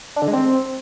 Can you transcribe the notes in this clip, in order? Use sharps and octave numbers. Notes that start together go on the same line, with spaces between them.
D4
D3
G#3
C4